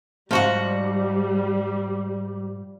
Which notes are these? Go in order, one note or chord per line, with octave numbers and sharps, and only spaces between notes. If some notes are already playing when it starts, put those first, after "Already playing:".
G#2 F3 G3 F#4 F#5